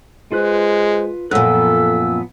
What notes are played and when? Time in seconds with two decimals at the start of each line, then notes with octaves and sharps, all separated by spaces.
0.32 G#3 F4 B4 C5 F#6
1.31 F#2 A#2 F3 B3 A4 E6 F#6